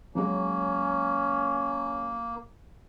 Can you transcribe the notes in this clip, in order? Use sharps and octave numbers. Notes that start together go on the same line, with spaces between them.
F#3 G#3 A#3 C#4